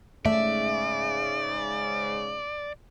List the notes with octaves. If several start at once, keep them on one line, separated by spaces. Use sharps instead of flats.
G#2 C#3 A3 D5 E5